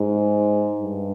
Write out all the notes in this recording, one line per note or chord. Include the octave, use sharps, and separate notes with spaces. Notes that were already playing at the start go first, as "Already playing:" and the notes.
Already playing: G#2
G2